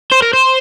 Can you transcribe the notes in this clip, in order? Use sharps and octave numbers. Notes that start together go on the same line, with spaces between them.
C5
A#4
C5